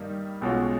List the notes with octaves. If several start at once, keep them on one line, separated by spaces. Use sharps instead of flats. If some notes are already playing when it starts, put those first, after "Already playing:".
Already playing: G2 D#3 G3 A#3 D#4
B1 B2 G#3 C#4 F4